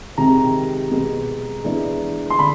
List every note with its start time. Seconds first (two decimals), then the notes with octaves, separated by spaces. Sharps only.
0.17 C3 D#3 G#3 C4 A#5
0.91 B2 G#3 B3
1.64 E3 G#3 B3 D4
2.30 C6
2.39 D3 B5